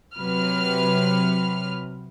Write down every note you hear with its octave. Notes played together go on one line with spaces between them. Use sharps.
C3 F#3 B4 F6